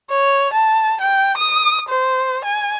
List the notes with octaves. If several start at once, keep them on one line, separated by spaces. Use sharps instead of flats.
C#5
A5
G5
D#6
C5
G#5